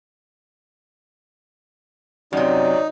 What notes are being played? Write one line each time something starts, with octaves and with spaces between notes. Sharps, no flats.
F#2 C3 F#3 D#4 D5